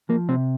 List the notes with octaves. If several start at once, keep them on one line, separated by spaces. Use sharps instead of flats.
F3 A#3
C3 C4